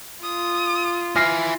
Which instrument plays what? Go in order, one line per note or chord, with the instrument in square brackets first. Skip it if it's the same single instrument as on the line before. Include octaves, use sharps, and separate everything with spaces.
[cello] F4 [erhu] D#6
[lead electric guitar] E4 G#5 [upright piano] F6 A#6 C7